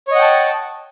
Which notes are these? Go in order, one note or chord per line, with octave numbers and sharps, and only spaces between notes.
C#5 D#5 F#5 G5 A5